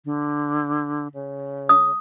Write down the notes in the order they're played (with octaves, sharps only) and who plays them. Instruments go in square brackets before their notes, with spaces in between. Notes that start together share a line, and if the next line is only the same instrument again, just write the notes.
[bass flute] D3
C#3
[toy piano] D#6